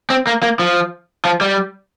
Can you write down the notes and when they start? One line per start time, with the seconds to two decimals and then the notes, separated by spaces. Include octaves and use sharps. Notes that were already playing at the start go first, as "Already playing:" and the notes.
0.10 C4
0.27 A#3
0.43 A#3
0.59 F3
1.25 F3
1.41 G3